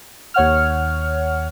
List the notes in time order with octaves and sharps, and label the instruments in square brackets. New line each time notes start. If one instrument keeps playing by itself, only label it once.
[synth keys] D#2 C#5 F#5 F6